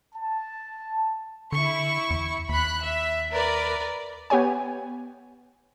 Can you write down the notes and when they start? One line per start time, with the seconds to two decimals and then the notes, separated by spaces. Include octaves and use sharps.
0.15 A5
1.52 D3 E4 C#6
2.10 E2
2.49 D#2 B5 F#6
2.81 E5
3.31 A#4 B4 D5
4.30 B3 G4 C#5 G#5